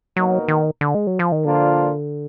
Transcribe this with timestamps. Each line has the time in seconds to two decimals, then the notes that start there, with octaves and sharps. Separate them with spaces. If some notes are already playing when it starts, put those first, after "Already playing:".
0.17 B2 F#3 A#3 D#4 F#4 A#4
0.48 D#3
0.81 D3
0.95 G#3
1.07 F#3
1.19 F3
1.32 D#3
1.44 A#2 D3 F3 A#3 D4 F4